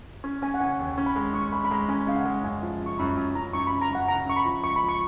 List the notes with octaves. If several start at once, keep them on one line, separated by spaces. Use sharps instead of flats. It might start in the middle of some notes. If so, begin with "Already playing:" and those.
C#4
C#4 G#5
F#5
C#3 G#5
D#2
C#4
B5
G#3
C#4 C#6
G#3 B5
B5
G#3 A#5
C#4 G#5
D#5
C#3 F5
F#5
G#3
F#2 G#5
F3
C#3
C#6
F#2 B5
F#2
F#2 A#5
F#2 C#6
B5
C#3
A#5
F#2 F#5
C#3 A#5
F#2 C#6
B5
F3
C#2 C#6
B5
F3
C#6